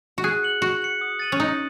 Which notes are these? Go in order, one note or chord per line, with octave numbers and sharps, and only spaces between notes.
F#4
G#4 F#6
C#7 F#7
F#4 F#6
C#7 F#7
D#6
A6 D#7 F#7
C#4
D#4 D#6